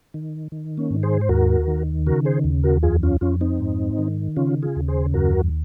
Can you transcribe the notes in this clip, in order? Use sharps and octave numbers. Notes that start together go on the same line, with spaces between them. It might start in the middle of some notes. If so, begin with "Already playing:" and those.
D#3
D#3
A#3 C#4
G#2
G#4 C5
C5
D#2 F#4 A#4
D#3
C#3 F#4 A#4
G#4 C5
D#2
F#4 A#4
F2 F4 G#4
C#4 F4
F2 C#4 F4
C4 D#4
G#2
D#3
C#3 C#4 F4
F4 G#4
D#2
G#4 C5
F#2 F#4 A#4